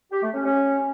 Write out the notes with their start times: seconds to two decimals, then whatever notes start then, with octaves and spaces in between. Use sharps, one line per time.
0.12 G4
0.23 A3
0.34 C#4
0.45 C#4